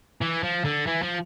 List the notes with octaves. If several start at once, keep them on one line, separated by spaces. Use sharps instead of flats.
E3
F3
D3
E3
F3